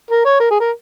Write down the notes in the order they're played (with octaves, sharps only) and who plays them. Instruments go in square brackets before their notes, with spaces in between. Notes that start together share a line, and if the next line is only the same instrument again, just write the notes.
[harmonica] A#4
C#5
A#4
G#4
A#4